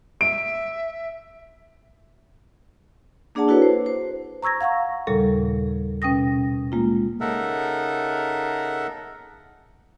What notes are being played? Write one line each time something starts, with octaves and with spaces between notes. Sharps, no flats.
E5 D7
A#3 D4 G#4 D5 F#5 A5
E4 F#4 A4 B4 C#5
C5
C5
A#5 C#6 E6 G#6 A#6
F5 F#5 A#5 C#6
D#2 A#2 C#3 G3 A4
B2 C#4 G5 D#6 A#6
G#3 A#3 F4
C#3 D#4 A4 A#4 E5 F#5